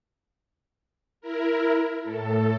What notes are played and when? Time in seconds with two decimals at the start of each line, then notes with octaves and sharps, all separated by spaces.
1.21 E4 A#4
2.02 A2 A4